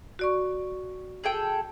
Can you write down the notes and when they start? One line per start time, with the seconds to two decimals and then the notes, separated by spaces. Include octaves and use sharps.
0.19 F#4 D5 C#6
1.24 G#4 A4 G5